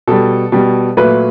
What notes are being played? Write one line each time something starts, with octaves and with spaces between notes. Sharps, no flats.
B2 G3 A4
B2 G3
A#2 F#3 A3 B4